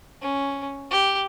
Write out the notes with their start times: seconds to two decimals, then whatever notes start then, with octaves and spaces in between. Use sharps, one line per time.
0.22 C#4
0.91 G4